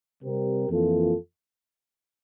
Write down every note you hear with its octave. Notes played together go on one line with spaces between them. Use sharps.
C3 G3 C4 G4 A#4
F2 E3 A#3 F4 A4